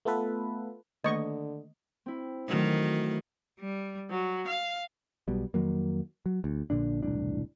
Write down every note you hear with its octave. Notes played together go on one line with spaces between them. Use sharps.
A3 B3 F4 A4 B4
D3 D#3 A3 A#3 D#5 C#6
C4 E4
D#3 E3 F#3 A3
G3
F#3
F5
B1 B2 G3
F2 D#3 F#3 A#3
F#3
D2
A#1 A#2 D3 D4
E1 C2 A2 D4